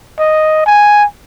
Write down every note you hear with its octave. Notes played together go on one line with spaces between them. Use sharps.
D#5
G#5